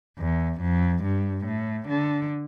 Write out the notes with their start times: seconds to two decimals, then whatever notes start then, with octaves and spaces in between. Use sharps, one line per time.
0.18 E2
0.61 F2
1.04 G2
1.46 A2
1.89 D3